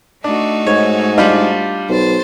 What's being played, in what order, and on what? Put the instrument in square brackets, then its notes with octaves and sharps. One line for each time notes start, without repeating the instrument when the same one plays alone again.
[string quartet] A3 D#4 F#4 [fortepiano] D4
[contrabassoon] G#2 [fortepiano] C#5
[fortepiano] G3 D4 F4
[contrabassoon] B1 [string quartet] C5 A6